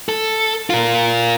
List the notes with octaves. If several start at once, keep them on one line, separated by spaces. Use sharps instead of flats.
A4
F4 A#4